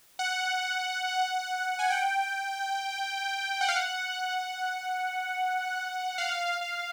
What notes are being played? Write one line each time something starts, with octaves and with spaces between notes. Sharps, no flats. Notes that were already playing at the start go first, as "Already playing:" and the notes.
F#5
G#5
G5
F#5
F5
F#5
F5
F5